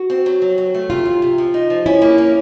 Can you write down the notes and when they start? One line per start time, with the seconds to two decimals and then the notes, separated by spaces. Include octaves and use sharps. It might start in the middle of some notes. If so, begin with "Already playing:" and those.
Already playing: F#4
0.10 C4
0.26 F#3
0.42 F#3
0.58 F#3
0.75 A3
0.90 C3 F4
1.05 C3
1.22 C3
1.38 F3
1.54 D#4
1.70 F3
1.86 C#4 E4
2.02 A#3
2.18 C#4